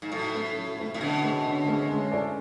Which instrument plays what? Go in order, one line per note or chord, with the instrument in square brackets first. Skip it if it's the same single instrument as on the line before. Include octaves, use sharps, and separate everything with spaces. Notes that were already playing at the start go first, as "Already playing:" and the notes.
[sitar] G#2
[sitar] A2 [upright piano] F#3
[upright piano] A3 C#4 E4
F#3
A3 C#4 E4
[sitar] A2
[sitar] B2 [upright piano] D3
[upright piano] A3 C#4 G#4 C#5
D3
A3 C#4 G#4 C#5
G#3
C#4 E4 A4 D5